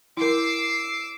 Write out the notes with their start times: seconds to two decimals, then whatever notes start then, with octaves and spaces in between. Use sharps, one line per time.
0.17 E4 A#4 D6 E6 C7